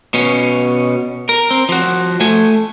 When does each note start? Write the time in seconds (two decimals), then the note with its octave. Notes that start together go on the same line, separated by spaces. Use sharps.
0.14 B2 C#4
1.29 A#4
1.51 C4
1.69 F3 F#4
2.21 A3 G#5